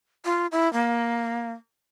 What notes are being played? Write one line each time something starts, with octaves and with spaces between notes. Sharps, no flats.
F4
E4
A#3